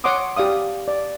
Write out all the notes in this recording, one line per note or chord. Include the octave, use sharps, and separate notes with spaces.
C#5 F#5 C6 D6 D#6
G4 D5 F5 D#6
D5